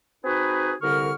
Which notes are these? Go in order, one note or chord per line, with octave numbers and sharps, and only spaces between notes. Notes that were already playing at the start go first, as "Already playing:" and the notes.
C4 D#4 F#4 G#4 B4
C2 D3 A#4 C#6 F6